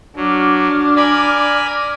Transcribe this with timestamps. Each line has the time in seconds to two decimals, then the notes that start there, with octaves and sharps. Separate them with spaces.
0.16 F#3 D4 D6 F6
0.96 A#4 D5 G#5 B5